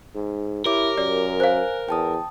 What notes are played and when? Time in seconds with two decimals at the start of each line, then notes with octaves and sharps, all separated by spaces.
0.15 G#2
0.66 E4 G4 A#4 C#5 D6
0.98 F#2 D5
1.40 C5 F5 G#5 F#6
1.89 E2 G5 A5 D#6